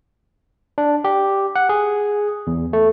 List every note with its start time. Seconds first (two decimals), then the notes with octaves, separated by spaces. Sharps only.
0.78 D4
1.04 G4
1.56 F#5
1.69 G#4
2.47 E2
2.73 A3